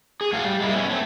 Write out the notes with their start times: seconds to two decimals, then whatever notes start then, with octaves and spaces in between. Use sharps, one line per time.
0.21 G#4
0.33 A2 F#4 F5
0.44 G3
0.60 G#3 A#3 E4
0.75 B3 C#4
0.90 A3 C4